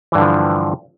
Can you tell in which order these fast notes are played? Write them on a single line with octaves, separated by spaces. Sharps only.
E3 G2 D3 F3